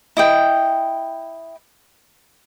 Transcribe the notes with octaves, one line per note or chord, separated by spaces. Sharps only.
E4 D#5 G5